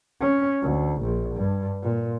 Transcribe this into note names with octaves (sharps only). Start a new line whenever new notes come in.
C#4
D2
A#1
G2
A#2